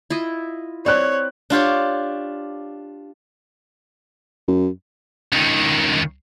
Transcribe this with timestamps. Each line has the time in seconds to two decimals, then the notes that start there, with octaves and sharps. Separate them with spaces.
0.10 E4 F4 D#5
0.86 C4 E4 C#5 D5 F#6
1.50 D4 F4 G4 C#5
4.48 F#2
5.33 C#2 D#3